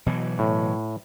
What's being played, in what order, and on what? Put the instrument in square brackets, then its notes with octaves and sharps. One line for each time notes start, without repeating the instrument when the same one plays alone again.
[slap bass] B2 E3 F#3
[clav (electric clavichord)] A2